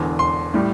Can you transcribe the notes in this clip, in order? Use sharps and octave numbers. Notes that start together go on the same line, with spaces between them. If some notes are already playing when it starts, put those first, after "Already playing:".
Already playing: E1 E2 D3
C6
A2 G3